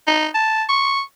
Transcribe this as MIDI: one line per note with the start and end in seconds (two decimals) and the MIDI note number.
0.07 0.27 63
0.35 0.64 81
0.69 1.02 85